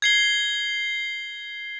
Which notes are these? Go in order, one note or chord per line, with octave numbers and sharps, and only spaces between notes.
G#6 C7 G7